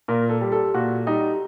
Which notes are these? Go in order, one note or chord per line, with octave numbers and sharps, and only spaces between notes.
A#2 A#4
A4
G3
A4
A#2 F#4
G3 D#4